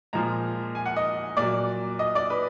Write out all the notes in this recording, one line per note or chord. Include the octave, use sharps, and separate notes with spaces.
A#2 F3 G#3 A#5
G#5
F#5
D#5
A#2 F#3 D5
D#5
D5
B4